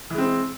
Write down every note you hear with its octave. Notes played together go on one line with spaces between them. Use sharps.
E3 G#3 C4